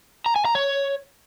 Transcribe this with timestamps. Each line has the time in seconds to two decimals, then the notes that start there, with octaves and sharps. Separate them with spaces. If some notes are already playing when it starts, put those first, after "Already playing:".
0.26 A#5
0.36 G#5
0.45 A#5
0.55 C#5